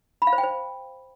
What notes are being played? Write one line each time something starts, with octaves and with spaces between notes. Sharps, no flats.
B5
F5
C5
G5
C5